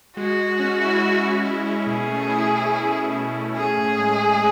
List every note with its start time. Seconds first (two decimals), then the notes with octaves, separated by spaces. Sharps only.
0.17 G#3 F#4
0.39 G#3
0.60 C#4
0.81 E4
1.02 E4
1.23 C#4
1.45 E4
1.66 C#4
1.87 B2 G#4
2.08 A3
2.29 E4
2.50 A3
2.71 E4
2.93 E4
3.14 A3
3.36 A3
3.56 C#4 G#4
3.77 A2
3.99 G#3
4.20 G#3